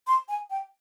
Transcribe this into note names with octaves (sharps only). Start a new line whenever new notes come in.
C6
G#5
G5